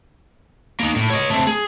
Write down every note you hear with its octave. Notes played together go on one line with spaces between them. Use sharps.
A#3 D#4
A2
C#5 D#5
A3 C4
G#4